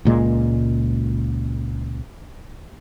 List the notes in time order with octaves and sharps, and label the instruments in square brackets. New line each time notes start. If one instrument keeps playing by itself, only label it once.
[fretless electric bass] C#2 A#2 G#3